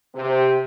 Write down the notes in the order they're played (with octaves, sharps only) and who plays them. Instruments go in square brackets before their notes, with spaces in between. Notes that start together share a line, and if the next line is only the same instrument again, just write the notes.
[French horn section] C3